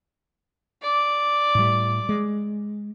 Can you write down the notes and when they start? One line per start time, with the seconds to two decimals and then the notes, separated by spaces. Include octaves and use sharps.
0.82 D5
1.55 A2 G3
2.09 G#3